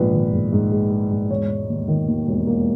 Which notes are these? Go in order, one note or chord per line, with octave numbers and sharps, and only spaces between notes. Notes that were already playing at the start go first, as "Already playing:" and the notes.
Already playing: A#1 G#2 B4
D#3
G#2
G#2
G#3
G#3
G#2
E1 C#5
E1
D#2
D#3
D#2
E1
A#3